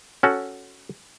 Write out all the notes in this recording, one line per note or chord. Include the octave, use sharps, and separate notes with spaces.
C#4 F#4 A4